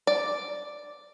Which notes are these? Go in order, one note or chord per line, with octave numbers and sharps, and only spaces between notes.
D5